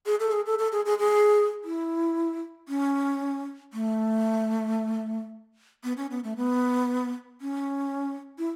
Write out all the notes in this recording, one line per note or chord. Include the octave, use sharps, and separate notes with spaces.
G#4
A4
G#4
A4
A4
G#4
G#4
G#4
E4
C#4
A3
B3
C#4
B3
A3
B3
C#4
E4